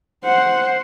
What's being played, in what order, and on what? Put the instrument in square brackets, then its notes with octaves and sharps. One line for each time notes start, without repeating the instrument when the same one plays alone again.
[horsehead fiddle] C5 F#5